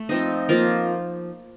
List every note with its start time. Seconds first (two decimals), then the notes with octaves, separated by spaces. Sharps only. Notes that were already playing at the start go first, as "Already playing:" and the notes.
Already playing: A3
0.09 F3 C4 D#4
0.49 F3 A#3 F4 A#4